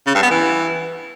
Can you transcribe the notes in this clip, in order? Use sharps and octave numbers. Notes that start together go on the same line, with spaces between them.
C#3
G2
B3
E3